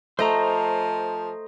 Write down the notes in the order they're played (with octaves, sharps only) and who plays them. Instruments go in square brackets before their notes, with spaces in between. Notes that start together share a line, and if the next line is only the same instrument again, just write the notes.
[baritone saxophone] F3 [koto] A3 [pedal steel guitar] C5 D#5 A#5